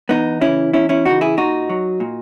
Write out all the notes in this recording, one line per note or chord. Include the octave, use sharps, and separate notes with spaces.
E2 B3 D#4
C#3 E3 C#4 E4
E2 C#4 E4
C#4 E4
C#3 E3 D#4 F#4
E4 G#4
A#2 D#4 F#4
F#3
A#2